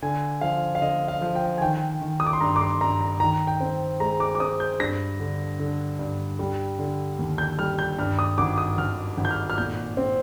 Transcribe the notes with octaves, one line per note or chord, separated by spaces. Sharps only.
D3 G#5
F3 F5
F5
D3 D#5
F5
F3
G5
G#5
D#3 G5
D#3
D#6
D6
C6
G2 A#5
D6
C6
G2 A#5
A#5
D#3 A#5
G5
C4
G#3 A#5
D6
D6
C4 D#6
G6
G2 A#6
D3
D3
G2
G3
D3
D#2
G6
G3 F6
G6
G2 F6
D#6
G#1 D6
D#6
G#1 F6
G#1
G6
F6
F6
A#2 G6
C4